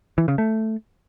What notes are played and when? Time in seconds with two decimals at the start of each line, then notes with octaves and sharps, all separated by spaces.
0.18 E3
0.28 C#3
0.38 A3